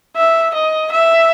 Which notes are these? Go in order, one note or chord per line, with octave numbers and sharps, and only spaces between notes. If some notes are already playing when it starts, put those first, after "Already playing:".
E5
D#5
E5